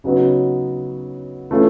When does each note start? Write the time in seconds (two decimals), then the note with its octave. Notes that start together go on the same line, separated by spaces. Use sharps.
0.04 C#3 F#3 B3 D#4 F#4
1.51 E3 A3 C#4 F4 A4